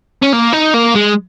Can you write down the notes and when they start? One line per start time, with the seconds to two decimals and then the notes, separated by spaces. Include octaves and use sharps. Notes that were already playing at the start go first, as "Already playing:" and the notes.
0.23 C#4
0.33 A#3
0.53 D#4
0.74 A#3
0.95 G#3